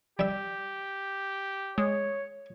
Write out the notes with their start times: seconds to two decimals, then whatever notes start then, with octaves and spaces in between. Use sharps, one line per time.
0.19 G3 G4 E5
1.78 G#3 C#5